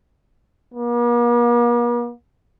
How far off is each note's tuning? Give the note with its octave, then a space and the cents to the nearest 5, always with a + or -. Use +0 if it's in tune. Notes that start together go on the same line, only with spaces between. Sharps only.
A#3 +45